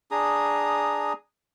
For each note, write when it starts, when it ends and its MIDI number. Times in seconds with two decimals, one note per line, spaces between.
0.11 1.13 62
0.11 1.13 68
0.11 1.13 82
0.11 1.13 87